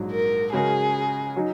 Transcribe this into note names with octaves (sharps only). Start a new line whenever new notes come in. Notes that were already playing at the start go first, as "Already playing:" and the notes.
Already playing: A#1 G#2 F#3
A#4
C#3 G#3 C#4 F#4 G#4 A#4
F#3 D#4